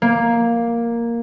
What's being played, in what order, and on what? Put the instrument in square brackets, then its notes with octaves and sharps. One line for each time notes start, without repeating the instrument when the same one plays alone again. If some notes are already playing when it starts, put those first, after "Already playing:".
[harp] A#3